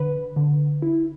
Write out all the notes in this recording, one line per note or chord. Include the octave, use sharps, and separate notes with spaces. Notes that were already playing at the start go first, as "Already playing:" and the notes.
Already playing: D3 B4
D3
E4